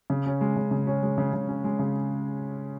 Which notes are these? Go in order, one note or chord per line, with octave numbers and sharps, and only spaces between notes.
C#3
C#4
G#3
C#3
C#3
C#4
G#3
C#3
C#3
C#4
G#3
C#3